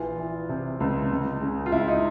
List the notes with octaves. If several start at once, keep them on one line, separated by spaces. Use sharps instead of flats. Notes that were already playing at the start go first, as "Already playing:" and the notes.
Already playing: A#1 E3 F4
E3
C3
C#2
C#2
C#3
F4
C#2 E4
D#4